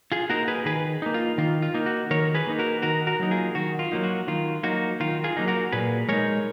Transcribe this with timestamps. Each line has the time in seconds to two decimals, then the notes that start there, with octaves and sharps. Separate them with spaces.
0.12 F4 G#4
0.29 A#3 D#4 F#4 A#4
0.48 G#4 B4
0.65 D#3 G#4 B4
1.02 A#3 D#4
1.14 F4
1.38 D#3 F4
1.62 F4
1.74 A#3 D#4
1.86 F#4
2.11 D#3 A#4 C#5
2.34 G#4 B4
2.47 A#3 D#4
2.59 F#4 A#4
2.82 D#3 F#4 A#4
3.07 F#4 A#4
3.20 F#3 A#3 D#4
3.31 F4 G#4
3.55 D#3 F#4
3.79 F4
3.92 F#3 A#3 D#4
4.04 F#4
4.28 D#3 F4
4.63 F#3 A#3 D#4 F#4
5.00 D#3 F4
5.24 F4 G#4
5.36 F#3 A#3 D#4
5.48 F#4 A#4
5.72 A#2 G#4 B4
6.09 G#3 D#4 A#4 C#5